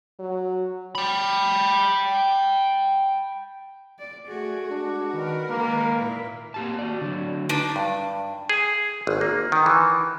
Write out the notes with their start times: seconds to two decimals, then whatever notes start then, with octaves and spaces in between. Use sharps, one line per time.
0.19 F#3
0.95 G5 B5
3.99 D5
4.28 A3 F#4 G#4
4.71 G#3 D4
5.13 D#3 A#4 B4
5.50 D#3 G#3 A#3
5.98 A#2 E4
6.54 A#3 G4 A5
6.79 F#4 D5
7.01 D3 F#3
7.49 D4 D#4
7.76 G2
8.49 G#4
9.07 G#1
9.21 A#3
9.52 D#3
9.66 E3